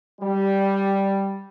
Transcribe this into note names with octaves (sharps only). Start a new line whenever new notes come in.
G3